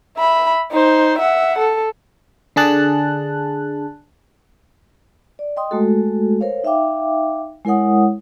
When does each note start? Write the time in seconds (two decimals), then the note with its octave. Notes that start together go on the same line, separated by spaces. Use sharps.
0.18 E5 B5
0.71 D#4 C5
1.18 E5 F#5
1.58 A4
2.56 D3 D4 G#4 A5 F#6
5.39 D5
5.57 D#5 G5 C6 D#6
5.71 G#3 A3 F#4 A4
6.41 A#4 C5 C#5 F5
6.64 D#4 E5 F5 G5 D6
7.65 G#3 E4 A#4 C#5 F#5 D#6